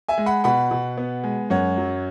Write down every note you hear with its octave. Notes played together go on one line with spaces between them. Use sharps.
E5 G#5
G#3
F#5 B5
B2 F#5 B5
B2
B3
G#3
F#2 C#5 F#5
F#3